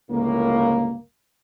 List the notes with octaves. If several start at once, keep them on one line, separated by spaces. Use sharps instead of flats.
G1 C#2 A2 A#3